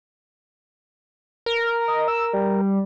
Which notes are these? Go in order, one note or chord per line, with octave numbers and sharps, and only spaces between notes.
A#4
D#5
E6
G3